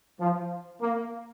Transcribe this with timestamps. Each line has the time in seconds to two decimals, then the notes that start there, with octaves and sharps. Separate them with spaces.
0.20 F3
0.82 A#3